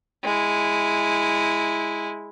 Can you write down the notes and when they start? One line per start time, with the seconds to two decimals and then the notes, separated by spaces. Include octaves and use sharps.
0.24 G#3 E4